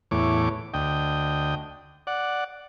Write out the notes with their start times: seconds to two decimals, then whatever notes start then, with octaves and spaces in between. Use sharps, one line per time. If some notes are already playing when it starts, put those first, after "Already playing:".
0.11 E2 A2 C#5 D6
0.74 D2 D#5 G5
2.07 D5 F#5